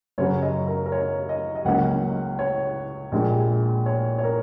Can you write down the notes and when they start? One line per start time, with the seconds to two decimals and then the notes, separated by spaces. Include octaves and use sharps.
0.18 F#2 C#3 F#3 C#5
0.42 D#5
0.67 A#4
0.86 A#4
0.92 C#5
1.29 D#5
1.55 D#5
1.65 C#2 C#3 F#3 A#3 C#4 F#5
2.39 C#5
3.12 A#1 A#2 G#3
3.86 C#5
4.18 C#5
4.24 A#4